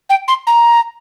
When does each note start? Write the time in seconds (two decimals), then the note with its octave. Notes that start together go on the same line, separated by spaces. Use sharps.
0.10 G5
0.28 C6
0.47 A#5